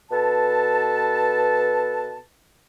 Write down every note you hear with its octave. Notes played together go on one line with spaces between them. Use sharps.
B2 A4 B4 A5